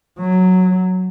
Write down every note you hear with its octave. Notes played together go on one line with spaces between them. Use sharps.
F#3